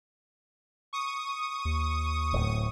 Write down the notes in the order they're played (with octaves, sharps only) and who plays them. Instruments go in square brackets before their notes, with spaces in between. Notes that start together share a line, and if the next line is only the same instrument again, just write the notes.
[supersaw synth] C#6 D#6
[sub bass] D#2
[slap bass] D1 A2